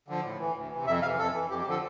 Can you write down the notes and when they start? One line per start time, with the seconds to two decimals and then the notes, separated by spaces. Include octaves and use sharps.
0.08 D3 F3
0.24 A2
0.40 E3
0.55 D2
0.71 C3 E3
0.87 F2 E5
1.02 C3 E3 F5
1.18 F2 A4
1.34 E3
1.50 F2 G4
1.61 G4
1.66 D3 F3 A4